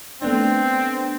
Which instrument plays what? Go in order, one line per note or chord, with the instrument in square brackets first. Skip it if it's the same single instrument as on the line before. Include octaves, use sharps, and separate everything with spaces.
[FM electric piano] A3 B3 D4 [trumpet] C4